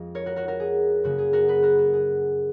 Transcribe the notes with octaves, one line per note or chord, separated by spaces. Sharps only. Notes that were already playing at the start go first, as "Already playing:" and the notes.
Already playing: F2 F3 G#3 D#5 F5
A#4 C#5
F#4 A#4
F#4 A#4
F#4 A#4
G#4
F#2 C#3 F#3 A#3 F#4
G#4
F#4 A#4
G#4 B4
F#4 A#4
F#4
G#4